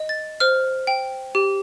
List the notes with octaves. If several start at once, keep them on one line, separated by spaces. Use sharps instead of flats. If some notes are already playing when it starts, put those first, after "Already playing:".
Already playing: D#5
A6
C5 F6
G5
G4